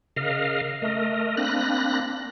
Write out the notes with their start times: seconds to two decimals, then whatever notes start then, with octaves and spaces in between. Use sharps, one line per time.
0.16 C#3 A#4 D#5 F5
0.82 A3 A#4 D#5
1.37 A#3 C4 D4 B5 F#6 A#6